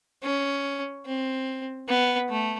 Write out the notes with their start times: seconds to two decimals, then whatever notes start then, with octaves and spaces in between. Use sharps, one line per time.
0.23 C#4
1.06 C4
1.88 B3
2.30 A3